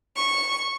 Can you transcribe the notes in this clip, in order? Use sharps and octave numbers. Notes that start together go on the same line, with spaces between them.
C#6